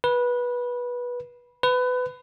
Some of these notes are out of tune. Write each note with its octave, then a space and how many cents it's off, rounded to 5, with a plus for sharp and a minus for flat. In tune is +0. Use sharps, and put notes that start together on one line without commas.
B4 -15
B4 +25